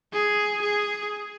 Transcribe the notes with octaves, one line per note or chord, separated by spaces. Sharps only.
G#4
G#4